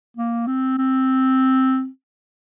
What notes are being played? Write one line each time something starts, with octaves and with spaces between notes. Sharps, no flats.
A#3
C4
C4